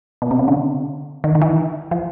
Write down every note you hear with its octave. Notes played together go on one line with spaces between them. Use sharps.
B2
C3
C#3
D3
D#3
D#3
E3
F3